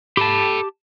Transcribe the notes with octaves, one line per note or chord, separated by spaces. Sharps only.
G4 A4 A5 B5